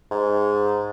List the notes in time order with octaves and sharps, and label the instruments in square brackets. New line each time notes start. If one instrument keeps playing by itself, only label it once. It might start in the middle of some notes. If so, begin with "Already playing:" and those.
[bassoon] G#2